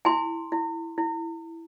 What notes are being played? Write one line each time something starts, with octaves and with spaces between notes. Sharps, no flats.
E4 G#5 C6
E4
E4